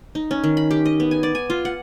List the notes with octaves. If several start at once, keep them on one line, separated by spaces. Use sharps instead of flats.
D#4
C#4
D#3
B5
G4
D#5
B3
G#5
D5
G#5
F4
F#5